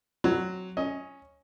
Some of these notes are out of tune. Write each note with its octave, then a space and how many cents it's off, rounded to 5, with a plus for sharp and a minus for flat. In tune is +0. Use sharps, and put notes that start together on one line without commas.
F#3 +0 C4 +0
C#4 +0 D#5 +25